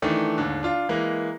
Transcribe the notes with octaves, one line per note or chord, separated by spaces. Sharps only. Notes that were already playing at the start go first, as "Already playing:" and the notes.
D#3 E3 A3 D4
D#2 G#2 D3
D4 F4
E3 G#3 A#3